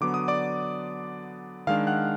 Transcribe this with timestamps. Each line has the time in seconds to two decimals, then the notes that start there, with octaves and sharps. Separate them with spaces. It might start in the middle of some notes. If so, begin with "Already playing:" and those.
0.01 D3 F#3 B3 D6
0.14 D#6
0.28 D5 D6
1.67 D#3 G#3 D4 F5 F6
1.87 F#5 F#6